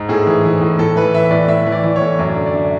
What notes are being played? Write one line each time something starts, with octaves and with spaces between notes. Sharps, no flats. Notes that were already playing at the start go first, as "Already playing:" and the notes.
Already playing: G#2
A2 G#4
E3
E3
A2
A2 A4
E3 B4
E3 E5
A2 D5
A2 E5
E3
D5
E3
C#5
A2
F#2 D5
D3
D5
D3 E5